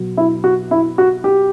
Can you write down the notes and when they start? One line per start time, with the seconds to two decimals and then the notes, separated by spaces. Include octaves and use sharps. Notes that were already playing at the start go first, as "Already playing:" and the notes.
Already playing: B2 F#3 B3
0.17 E4
0.44 F#4
0.71 E4
0.98 F#4
1.24 G4